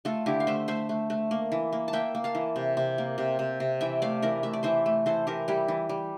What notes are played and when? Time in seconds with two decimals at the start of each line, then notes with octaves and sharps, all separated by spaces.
0.05 A3 F4 A4
0.26 D3 E4 G4
0.40 F5
0.47 A3 C5 E5
0.68 A3 C5 E5
0.89 A3
1.10 A3
1.31 A#3
1.52 E3
1.73 A#3
1.88 A5
1.93 A#3 E5 G5
2.15 A#3
2.24 F5 A5
2.35 E3
2.56 C3
2.77 C3
2.98 A#3
3.18 C3
3.39 C3
3.60 C3
3.81 E3 E5 G5
4.02 A3 D5 F5
4.22 E3 A#4 D5
4.43 A3 E5
4.53 D5
4.63 E3 C5 E5
4.86 A3
5.06 E3 A4 C5
5.27 E3 G4 A#4
5.48 G3 E4 G4
5.68 E3
5.89 G3